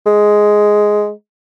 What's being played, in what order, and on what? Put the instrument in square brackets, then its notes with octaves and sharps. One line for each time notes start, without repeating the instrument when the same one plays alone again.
[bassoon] G#3